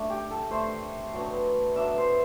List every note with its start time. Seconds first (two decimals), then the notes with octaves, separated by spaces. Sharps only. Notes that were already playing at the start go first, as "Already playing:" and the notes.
Already playing: A3 D4
0.10 G4
0.30 A4
0.51 A3 D4 C5
1.14 F#3 B3 D4
1.76 F#3 B3 D4 E5
1.98 C5